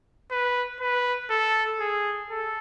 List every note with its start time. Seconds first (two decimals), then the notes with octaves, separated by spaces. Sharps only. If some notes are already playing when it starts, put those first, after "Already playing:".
0.31 B4
0.81 B4
1.30 A4
1.80 G#4
2.30 A4